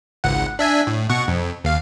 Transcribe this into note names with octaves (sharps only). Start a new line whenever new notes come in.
G#1 C#2 F#5
D4 E5 G#5
A2
B2 F#5 C#6
F2
D#2 F5